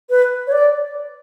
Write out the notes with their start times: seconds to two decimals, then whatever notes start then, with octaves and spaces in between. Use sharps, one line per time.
0.10 B4
0.47 C#5
0.52 D5